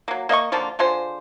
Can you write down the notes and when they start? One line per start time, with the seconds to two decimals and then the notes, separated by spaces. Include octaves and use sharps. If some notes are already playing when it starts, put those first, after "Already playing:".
0.08 F#3 A#3
0.29 A#3 D#5 E5 C#6
0.52 D3 F3 A#3 F4
0.79 D3 G#3 F4 C5